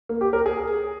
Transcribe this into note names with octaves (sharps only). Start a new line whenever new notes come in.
A#3
G4
A#4
G#4